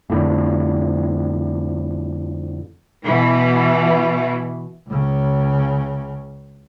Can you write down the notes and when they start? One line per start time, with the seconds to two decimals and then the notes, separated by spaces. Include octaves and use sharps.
0.10 F2 A2 D3
3.04 B2 E3
4.89 C#2 C#3